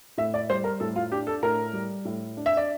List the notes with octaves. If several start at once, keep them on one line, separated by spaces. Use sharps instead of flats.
A2 E5
D5
G3 C5
A#4
A2 A4
F4
D4 G4
A4
A2 A#4
G3
A2
D4
E5
D5